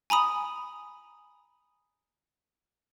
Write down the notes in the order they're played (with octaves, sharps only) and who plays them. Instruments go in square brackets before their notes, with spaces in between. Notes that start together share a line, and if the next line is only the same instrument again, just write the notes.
[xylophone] G#5 A#5 B5 D#6